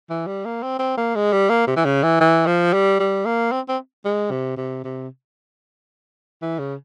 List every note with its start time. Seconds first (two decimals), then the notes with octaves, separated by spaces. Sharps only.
0.10 E3
0.27 G3
0.45 A#3
0.63 C4
0.79 C4
0.97 A#3
1.15 G#3
1.32 G3
1.49 A#3
1.67 C3
1.76 E3
1.85 C#3
2.03 E3
2.21 E3
2.47 F3
2.73 G3
3.00 G3
3.25 A#3
3.52 C4
3.68 C4
4.05 G#3
4.31 C3
4.57 C3
4.84 C3
6.42 E3
6.59 C#3